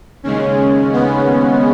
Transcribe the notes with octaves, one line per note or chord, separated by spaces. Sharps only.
D#2 C#3 G#3 C#4
B3